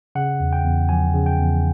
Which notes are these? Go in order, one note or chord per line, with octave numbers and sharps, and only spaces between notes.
C#3 F#5
E2
G5
E2
F3 G#5
C#3
G5
E2